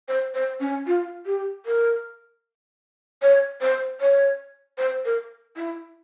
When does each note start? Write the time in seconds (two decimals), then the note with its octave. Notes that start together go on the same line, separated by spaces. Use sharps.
0.08 C5
0.34 C5
0.60 C#4
0.87 F4
1.26 G4
1.66 A#4
3.22 C#5
3.61 C5
4.01 C#5
4.78 C5
5.05 A#4
5.56 E4